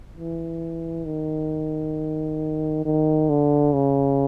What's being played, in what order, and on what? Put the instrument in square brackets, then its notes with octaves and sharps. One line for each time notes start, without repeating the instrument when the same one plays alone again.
[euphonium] E3
D#3
D#3
D3
C#3